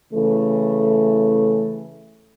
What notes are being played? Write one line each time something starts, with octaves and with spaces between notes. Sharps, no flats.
C#3 E3 A3